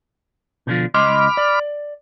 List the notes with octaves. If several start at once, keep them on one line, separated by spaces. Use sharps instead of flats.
B2 D3 F3
C#2 D#5 B5 C6 D6 F6
D5